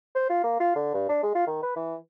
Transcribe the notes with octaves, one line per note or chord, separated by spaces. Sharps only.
C5
F4
A#3
F4
D3
G2
D4
G#3
F4
D#3
B4
E3